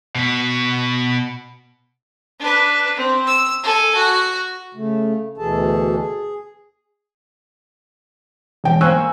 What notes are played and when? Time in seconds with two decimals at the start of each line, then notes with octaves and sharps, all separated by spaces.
0.15 B2 B3
2.39 D4 B4
2.96 C4
3.27 E6
3.63 A4 G#5
3.96 F#4
4.74 C#3 A3
5.38 D2 B2 E3 G#4 A4 A5
5.96 G#4
8.64 E1 G5
8.81 A#3 C5 G#5 C#6 E6 F#6